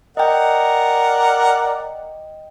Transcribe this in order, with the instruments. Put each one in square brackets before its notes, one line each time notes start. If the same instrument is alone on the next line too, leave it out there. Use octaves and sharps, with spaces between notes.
[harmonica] A#4 D5 F#5 [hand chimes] D#5 G5